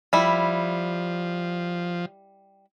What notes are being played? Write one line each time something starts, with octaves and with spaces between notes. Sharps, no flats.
F3 G3 E4